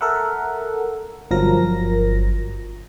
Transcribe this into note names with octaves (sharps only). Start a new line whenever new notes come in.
A4 A#4 E5 F#5
G1 F3 F#3 A#4 A#6